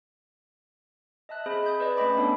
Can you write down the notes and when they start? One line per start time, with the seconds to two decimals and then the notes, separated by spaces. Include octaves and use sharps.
1.29 D#5 E5 A5 F#6
1.46 C4 G#4 C5 D#5 B5
1.66 G#5 D#6 G6
1.80 B4 D5 D#5
1.97 A3 C#4 D#5 G5 B5 D6
2.17 B3 D4 A4 C#5